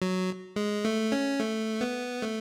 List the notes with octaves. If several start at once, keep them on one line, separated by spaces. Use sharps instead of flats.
F#3
G#3
A3
C#4
A3
B3
A3